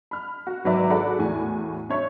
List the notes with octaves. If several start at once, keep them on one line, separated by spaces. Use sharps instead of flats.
B5 F6
F#4
G#1 F#3 B4 D5 E5
F#4 G#4 A4 D5 B5
E2 A2 F#4 G#5
D4 C#5 E5 C#6